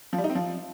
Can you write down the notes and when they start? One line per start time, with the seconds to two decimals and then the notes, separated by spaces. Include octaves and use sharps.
0.13 F3
0.18 G3
0.24 D#4
0.30 C4
0.35 F3